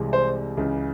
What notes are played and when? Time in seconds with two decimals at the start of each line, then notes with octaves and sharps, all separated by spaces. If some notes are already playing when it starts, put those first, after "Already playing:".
Already playing: C2 C3 E3 G#3
0.13 C5
0.57 C#2 C#3 E3